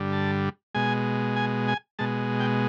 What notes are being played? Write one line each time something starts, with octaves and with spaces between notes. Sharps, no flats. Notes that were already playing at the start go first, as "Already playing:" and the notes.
Already playing: G2 D3 G3
A5
B2 G#3 G#5
G#5
G#5
B2 G#3 A5
G5